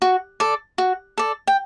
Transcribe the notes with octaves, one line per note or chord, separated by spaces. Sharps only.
F#4
A4 D5
F#4
A4 D5
G5